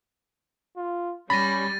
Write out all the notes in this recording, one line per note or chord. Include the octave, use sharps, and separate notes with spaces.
F4
G3 C#4 B5 A6 A#6 D#7